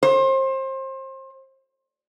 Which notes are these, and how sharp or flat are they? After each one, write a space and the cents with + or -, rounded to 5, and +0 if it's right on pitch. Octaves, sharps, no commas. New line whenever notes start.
C5 +30